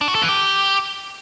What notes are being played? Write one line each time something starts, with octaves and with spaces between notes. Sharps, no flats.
D4
F#4
A4
E3
G4